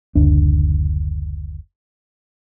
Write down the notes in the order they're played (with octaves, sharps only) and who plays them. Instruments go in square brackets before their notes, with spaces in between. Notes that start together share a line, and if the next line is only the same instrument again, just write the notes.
[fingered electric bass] F#1 D2 D4